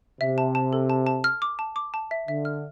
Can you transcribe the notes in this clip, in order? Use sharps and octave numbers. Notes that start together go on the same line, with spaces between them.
C3 E5
A5
A5
A4
A5
A5
F6
D6
A5
D6
A5
E5
D3 E5
F6